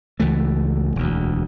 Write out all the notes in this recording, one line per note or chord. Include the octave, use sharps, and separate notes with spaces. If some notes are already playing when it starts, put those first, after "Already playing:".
C#2 E3 A3
E1 D2